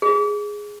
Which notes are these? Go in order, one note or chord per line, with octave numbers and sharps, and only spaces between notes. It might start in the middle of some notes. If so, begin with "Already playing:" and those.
G#4